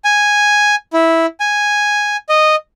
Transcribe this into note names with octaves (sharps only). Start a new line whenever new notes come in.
G#5
E4
G#5
D#5